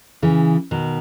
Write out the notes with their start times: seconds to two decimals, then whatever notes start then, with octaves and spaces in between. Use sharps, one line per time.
0.22 C#3 E3
0.71 B2 D#3